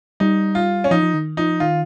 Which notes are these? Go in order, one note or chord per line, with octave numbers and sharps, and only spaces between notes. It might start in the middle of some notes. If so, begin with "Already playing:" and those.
G3 D#4
F4
C#4
F3 D#4
F3
D#3
F3 D#4
D#3 F4